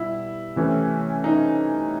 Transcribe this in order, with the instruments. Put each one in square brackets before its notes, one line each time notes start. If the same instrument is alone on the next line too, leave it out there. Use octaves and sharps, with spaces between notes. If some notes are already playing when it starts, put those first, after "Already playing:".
Already playing: [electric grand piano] B2 G3 [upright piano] E4
[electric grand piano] C3 E3 A3 C#4
[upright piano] D#4